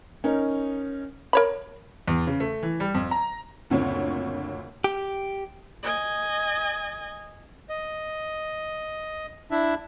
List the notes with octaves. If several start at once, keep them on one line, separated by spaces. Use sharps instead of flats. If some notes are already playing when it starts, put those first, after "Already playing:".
C#4 D#4 A#4
A#4 C#5 B5
E2
C#3
A3
E3
G3
F2
A#5
F#1 D2 A#2 C4 C#5
G4
D#5 G#5
D#5
D4 E4 E5